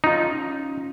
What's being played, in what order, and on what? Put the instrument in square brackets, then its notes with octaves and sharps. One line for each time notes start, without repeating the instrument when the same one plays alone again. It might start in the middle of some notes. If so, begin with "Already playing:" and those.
[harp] C#4 F4 [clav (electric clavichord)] D#4